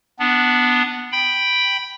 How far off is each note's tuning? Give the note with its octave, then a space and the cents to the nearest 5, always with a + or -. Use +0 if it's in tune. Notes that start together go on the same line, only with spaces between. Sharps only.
B3 +0 D4 +0
G5 +0 B5 +0